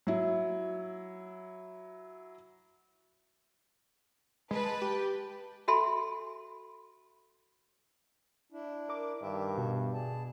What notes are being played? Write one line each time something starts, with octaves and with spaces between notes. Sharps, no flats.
F#3 E4
G#3 B4 A5
G4
F#4 A4 E5 G#5 B5 C6
D4 E4
A#4 D6
G2 D#3 E5
B2
G#4 A5